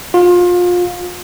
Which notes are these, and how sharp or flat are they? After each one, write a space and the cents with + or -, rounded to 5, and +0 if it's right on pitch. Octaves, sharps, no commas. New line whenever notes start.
F4 +25